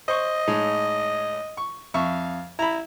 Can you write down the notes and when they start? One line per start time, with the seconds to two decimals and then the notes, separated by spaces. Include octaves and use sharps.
0.08 C5 D#5 C#6
0.47 A2 G#3 D#4
1.57 C#6
1.94 F2 E5 F5 C#6
2.59 E4 A#5 B5